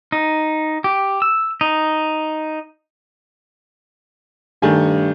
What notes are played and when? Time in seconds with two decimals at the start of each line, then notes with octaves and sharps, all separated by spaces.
0.12 D#4
0.84 G4
1.22 E6
1.61 D#4
4.62 G2 D#3 A3 G#5